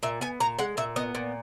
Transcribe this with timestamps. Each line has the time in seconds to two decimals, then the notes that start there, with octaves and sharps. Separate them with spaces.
0.03 A#2 E5
0.21 B3 G#5
0.40 A#2 A#5
0.59 G#3 F#5
0.77 A#2 E5
0.96 B3 D#5
1.15 A#2